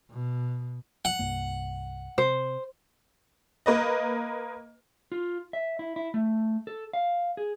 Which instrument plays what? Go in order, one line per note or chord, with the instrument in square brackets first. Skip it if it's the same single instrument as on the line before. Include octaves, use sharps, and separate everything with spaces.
[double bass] B2
[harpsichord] F#5
[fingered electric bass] C2 G2 A#3
[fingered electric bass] C3 [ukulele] C5
[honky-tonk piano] A#3 B4 D#5
[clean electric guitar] F4
E5
E4
E4
A3
A4
F5
G#4